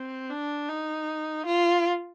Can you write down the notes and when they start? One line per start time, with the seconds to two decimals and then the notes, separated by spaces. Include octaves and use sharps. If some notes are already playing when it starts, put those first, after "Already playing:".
Already playing: C4
0.30 D4
0.69 D#4
1.46 F4